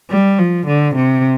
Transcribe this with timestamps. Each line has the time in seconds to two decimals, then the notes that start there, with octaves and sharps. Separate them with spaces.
0.11 G3
0.39 F3
0.67 D3
0.96 C3